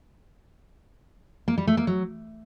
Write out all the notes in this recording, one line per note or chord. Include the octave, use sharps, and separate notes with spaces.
A#3
G3
A3
A#3
F#3